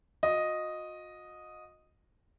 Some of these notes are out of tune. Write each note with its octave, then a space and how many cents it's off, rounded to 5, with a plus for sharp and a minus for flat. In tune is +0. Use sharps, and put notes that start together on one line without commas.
F#4 -45 D#5 +0